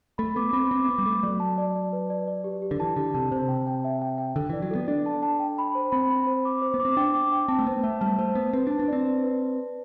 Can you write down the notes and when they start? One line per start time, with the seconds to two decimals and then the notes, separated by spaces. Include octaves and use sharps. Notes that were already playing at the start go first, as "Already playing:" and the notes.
0.18 A3 B5
0.36 B3 D6
0.53 C4 B5
0.71 C4 D6
0.89 B3 D6
0.98 G3
1.06 A3 D6
1.23 F#3 D5
1.40 A5
1.58 D5
1.75 D5
1.93 B4
2.10 D5
2.28 D5
2.44 G4
2.62 G4
2.71 D3
2.79 E3 A5
2.96 D3 G4
3.14 C3 A5
3.31 C3 C5
3.48 G5
3.67 G5
3.84 E5
4.02 G5
4.18 G5
4.36 D3 A4
4.50 E3 D5
4.62 F#3
4.71 B3 A4
4.88 D4 D5
5.06 A5
5.23 A5
5.40 G5
5.58 B5
5.75 C5
5.92 C4 B5
6.10 B5
6.27 C5
6.45 D6
6.62 C5
6.74 B3
6.80 D6
6.85 C4
6.97 D4 G5
7.14 D6
7.32 G5
7.48 C4 A5
7.59 A3
7.66 B3 C5
7.83 A3 E5
8.01 G3 A5
8.19 A3 C5
8.35 B3 C5
8.53 C4 B4
8.67 D4 A5
8.79 D4
8.88 C4 D5
9.05 D5
9.24 B4